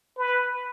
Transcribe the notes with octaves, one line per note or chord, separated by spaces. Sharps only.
B4